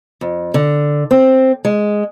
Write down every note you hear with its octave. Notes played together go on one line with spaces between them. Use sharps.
F2
D3
C4
G#3